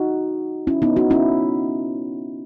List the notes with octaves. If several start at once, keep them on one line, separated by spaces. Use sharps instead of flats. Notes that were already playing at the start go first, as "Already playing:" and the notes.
Already playing: D#4 F#4
C#4 E4
B3 D#4
D#4 F#4
C#4 E4